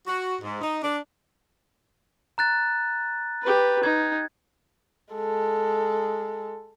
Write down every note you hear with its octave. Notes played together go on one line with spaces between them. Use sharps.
F#4
G#2
D#4
D4
A#5 F#6 A6
G4 B4
D#4 G#6
G#3 A4